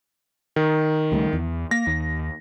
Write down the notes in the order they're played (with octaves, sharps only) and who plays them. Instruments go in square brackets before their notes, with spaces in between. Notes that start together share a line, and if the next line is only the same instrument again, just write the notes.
[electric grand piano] D#3
[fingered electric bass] C#2 G3 A3
E2
[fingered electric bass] A#3 [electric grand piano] A#6
[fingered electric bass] D#2